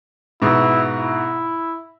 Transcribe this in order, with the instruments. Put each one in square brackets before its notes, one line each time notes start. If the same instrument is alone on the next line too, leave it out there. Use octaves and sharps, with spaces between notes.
[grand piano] G#2 B2 [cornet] E4
[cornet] E4